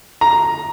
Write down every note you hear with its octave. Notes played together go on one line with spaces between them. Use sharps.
A#5